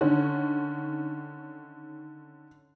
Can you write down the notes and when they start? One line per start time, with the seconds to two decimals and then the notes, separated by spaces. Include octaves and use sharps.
0.01 D3 D#3 C#4